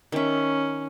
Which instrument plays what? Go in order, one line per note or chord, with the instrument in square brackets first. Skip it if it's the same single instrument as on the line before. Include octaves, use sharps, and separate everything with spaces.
[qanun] D#3 E5 [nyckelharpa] C#4